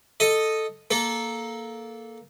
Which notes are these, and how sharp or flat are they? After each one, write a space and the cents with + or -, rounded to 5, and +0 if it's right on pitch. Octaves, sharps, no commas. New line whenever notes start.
A4 +0 D#5 -5
A#3 +0 A4 -15